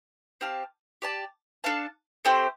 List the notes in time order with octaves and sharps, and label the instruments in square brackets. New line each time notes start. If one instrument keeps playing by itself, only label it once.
[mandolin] C4 G4 F5 A5
G4 D5 A5
D4 A4 F5 A5
A3 C4 G4 C5